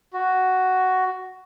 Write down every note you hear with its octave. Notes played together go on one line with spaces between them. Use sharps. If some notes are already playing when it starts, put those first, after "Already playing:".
F#4